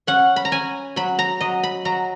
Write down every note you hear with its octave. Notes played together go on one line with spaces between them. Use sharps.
C#4 F#5
B5
A#5
C#4 G#5
F#3 B5
A#5
F#3 D#5
B5
F#3 A#5